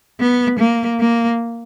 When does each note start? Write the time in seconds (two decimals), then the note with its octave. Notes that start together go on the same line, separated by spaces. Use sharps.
0.20 B3
0.59 A#3
1.00 A#3